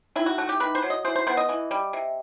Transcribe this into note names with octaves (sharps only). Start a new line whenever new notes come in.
D#3 E4
F#4
A3 F#4
G4
D#3 B4
C5
F#3
D#5
E3 C5
C5
B3 C5
D#5
E3
G3
C3